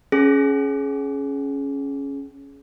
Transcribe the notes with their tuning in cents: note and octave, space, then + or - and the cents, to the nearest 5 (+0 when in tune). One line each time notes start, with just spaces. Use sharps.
C#4 +0 G#4 +25